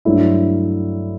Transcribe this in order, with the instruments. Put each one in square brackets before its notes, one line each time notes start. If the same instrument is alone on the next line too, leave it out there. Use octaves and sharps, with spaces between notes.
[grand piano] G2 F#3 A3 E4